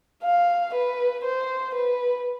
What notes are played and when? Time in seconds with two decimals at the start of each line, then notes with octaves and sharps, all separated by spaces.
0.23 F5
0.74 B4
1.24 C5
1.75 B4